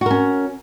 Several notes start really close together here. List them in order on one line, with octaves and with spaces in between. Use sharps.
F#4 A#4 C#4